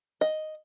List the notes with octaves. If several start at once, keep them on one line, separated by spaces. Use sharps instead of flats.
D#5